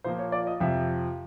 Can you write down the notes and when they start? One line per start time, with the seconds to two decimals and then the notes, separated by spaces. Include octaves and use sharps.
0.04 A#2 F3 A#3 C5
0.19 C#5
0.32 D5
0.47 D#5
0.60 F2 C3 F3 E5